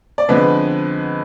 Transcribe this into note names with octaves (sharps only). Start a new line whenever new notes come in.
D5
F2 D3 G#3 B3 B4